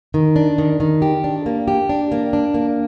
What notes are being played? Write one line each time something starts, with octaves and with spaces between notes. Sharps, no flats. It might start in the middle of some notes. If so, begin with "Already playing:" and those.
D#3
D4
D#3
D#3
G4
D4
A#3
G4
D4
A#3
D4
A#3